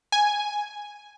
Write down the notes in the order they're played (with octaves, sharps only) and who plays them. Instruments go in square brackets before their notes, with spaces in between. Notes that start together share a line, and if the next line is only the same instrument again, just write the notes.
[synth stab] G#5